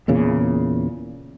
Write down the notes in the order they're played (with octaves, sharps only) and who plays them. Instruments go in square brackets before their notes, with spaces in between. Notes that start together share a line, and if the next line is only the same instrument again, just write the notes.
[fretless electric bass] E2 A#2 C#3